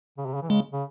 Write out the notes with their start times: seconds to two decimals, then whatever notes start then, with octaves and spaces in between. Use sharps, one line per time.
0.18 C#3
0.26 C3
0.34 C#3
0.42 E3
0.50 C#3 G#3
0.73 C#3